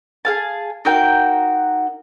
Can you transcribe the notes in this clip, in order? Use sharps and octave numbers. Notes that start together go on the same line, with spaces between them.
G#4 F5 A5
D#4 F#4 A#4 G5